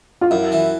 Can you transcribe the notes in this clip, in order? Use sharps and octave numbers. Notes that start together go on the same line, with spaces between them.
F4
F#2 E4
E3